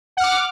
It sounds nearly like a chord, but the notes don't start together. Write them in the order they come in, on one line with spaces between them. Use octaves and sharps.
F#5 F6 D6